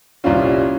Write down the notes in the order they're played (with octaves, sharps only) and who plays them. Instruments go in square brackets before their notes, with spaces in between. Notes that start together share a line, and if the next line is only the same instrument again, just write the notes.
[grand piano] C2 A#2 G3 C#4 F4